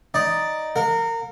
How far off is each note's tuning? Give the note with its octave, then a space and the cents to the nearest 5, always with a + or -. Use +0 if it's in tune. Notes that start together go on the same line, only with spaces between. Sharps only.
D#4 +0 D5 +0
A#4 -25 F5 +45